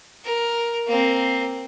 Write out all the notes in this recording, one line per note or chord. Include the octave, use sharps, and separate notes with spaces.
A#4
A#3 C4